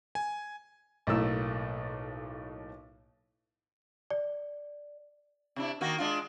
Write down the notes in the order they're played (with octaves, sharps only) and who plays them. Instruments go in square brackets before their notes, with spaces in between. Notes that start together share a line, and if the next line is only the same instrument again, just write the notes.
[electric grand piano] G#5
[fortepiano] B1 A2 A3 A#3 E6
[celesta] D5
[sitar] C3 D4 E4
D#3 A#3 F#4
G#3 D4 F4